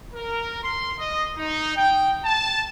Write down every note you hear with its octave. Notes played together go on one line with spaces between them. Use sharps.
A#4
C6
D#5
D#4
G5
A5